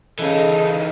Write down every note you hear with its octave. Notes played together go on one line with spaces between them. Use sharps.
C#3 E3 D#4 A4 D#5